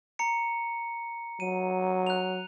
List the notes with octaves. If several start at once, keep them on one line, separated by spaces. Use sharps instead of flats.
A#5 C#7
F#3 D#7
F#6 F7